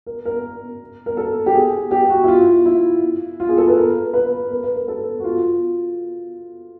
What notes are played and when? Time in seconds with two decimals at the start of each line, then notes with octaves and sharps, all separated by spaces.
0.06 A#4
0.25 A#4
1.06 A#4
1.17 A4
1.46 G4
1.54 G#4
1.91 G4
2.10 F#4
2.24 E4
2.28 F4
2.66 E4
3.40 F4
3.49 G#4
3.58 A4
3.67 B4
3.77 A#4
4.13 B4
4.51 A#4
4.64 B4
4.76 A#4
4.88 A4
5.20 F#4
5.24 F4